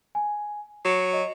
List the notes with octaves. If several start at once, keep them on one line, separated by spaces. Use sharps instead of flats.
G#5
F#3 C7 C#7 E7
D#5